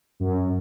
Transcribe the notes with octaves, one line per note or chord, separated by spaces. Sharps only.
F#2